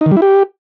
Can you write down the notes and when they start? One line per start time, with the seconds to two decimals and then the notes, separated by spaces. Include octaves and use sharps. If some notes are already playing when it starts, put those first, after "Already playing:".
0.01 D#4
0.06 D#3
0.11 G3
0.17 E4
0.22 G4